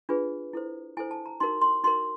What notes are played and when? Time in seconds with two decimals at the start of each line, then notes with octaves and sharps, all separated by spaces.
0.09 D4 F4 G#4 B4
0.53 E4 A4 C5
0.97 E4 A4 C5 G#5
1.11 A5
1.26 A#5
1.40 D#4 F#4 A#4 C6
1.62 C6
1.84 D#4 F#4 A#4 C6